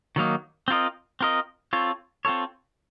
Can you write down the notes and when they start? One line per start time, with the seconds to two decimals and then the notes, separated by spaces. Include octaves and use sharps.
0.16 D#3 F#3 A#3 D#4
0.68 C4 F4 A#4 D#5
1.21 C4 F4 A#4 D#5
1.73 C4 F4 A4 C#5
2.25 C4 F4 A4 C#5